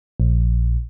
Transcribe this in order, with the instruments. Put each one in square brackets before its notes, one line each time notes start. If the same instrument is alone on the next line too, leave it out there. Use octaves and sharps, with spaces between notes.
[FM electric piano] A#1